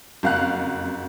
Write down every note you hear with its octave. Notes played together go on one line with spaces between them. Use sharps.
F#1 F2 F5 F#5 F#6